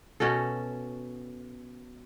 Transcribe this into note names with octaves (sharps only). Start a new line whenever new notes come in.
B2 C#4 F#4 A4